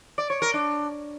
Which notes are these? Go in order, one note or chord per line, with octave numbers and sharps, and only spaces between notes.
D5
C#5
A#4
D4